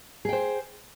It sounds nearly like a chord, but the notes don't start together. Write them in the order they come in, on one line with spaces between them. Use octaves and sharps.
G#4 G5 C5